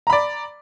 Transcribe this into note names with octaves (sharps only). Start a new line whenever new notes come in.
D5 A#5 B5